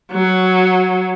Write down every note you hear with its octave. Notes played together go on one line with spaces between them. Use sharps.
F#3